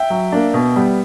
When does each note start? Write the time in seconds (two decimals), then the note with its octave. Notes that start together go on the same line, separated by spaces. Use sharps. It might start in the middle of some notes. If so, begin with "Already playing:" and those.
Already playing: E5 G5
0.10 F#3
0.32 A#3 D4
0.54 B2
0.76 G3 B3